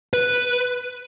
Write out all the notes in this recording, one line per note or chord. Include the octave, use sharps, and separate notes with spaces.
B4